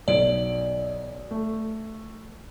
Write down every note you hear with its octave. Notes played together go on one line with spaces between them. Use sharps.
B1 D5 D7
A3